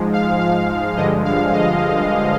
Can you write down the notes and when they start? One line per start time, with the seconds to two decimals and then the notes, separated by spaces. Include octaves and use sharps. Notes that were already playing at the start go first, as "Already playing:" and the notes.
Already playing: G#2 F3 G#3
0.13 F5
0.41 F5
0.97 G2 D3 F3 G#3 D#5
1.25 F5
1.53 D#5